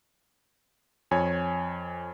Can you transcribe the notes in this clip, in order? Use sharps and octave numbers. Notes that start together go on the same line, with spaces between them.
F2 C#5 G#5